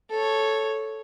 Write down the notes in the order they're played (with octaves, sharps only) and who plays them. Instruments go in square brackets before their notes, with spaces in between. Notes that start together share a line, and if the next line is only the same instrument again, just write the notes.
[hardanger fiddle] A4 C#5